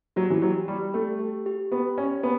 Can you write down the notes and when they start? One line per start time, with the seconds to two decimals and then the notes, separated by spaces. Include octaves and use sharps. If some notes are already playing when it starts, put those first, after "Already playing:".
0.16 F#3 G4
0.30 E3
0.42 F#3 G4
0.68 G3 G4
0.94 A3 G4
1.19 G4
1.46 G4
1.72 B3 G4
1.98 C#4 G4
2.23 B3